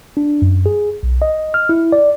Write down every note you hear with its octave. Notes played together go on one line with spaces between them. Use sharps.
D4
F#2
G#4
B1
D#5
F6
E4
D5